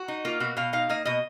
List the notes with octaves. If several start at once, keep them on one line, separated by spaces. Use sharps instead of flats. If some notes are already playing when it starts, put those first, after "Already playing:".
Already playing: F#4
D#4
A#3 F4
B2 F#4
B2 F5
D#4 F5
A#3 D#5
B2 D#5